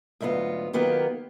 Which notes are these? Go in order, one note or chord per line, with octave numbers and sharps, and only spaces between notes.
D2 G#2 F#3 B3 F4
D#3 F#3 A#3 B3 F4 G4